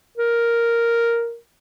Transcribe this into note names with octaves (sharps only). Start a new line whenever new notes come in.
A#4